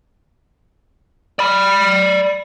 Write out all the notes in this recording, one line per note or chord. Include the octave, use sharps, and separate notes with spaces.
D5 B5